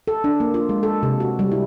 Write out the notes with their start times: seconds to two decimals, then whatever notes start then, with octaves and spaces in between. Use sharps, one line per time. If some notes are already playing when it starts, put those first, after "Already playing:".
0.08 A4
0.24 D4
0.40 A#3
0.54 F4
0.69 G#3
0.83 A4
1.03 C3
1.20 F#4
1.39 G3
1.52 E4